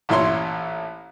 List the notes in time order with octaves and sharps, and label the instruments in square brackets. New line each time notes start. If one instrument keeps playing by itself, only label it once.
[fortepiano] A1 A#2 E4 C#5 C6